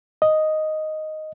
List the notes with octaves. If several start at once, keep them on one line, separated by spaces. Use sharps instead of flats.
D#5